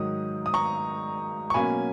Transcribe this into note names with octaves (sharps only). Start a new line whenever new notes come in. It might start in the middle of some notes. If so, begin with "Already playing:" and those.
Already playing: G#2 D#3 F#3 D#6
D#6
A#5 C#6
C#6
B2 F#3 A#3 C#4 G#5 B5